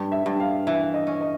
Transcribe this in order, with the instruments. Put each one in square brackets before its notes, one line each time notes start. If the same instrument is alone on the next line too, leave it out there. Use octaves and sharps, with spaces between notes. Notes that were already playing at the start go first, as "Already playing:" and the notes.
Already playing: [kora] G2
[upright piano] E5
[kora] G2
[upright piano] F5
[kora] E3 [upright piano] E5
[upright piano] D#5
[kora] C#4
[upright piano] D#5